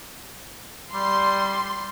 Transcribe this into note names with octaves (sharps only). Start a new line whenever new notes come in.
G3 C6